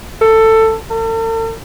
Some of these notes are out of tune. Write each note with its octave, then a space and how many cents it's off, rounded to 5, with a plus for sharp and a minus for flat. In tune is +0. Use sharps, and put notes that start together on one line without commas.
A4 +15
A4 +45